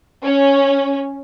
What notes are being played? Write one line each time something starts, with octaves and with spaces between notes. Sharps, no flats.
C#4